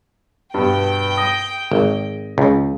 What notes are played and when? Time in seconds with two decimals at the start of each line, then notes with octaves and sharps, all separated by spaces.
0.54 G2 B2 G5
1.17 D#6 A#6
1.72 G#1
2.38 C#2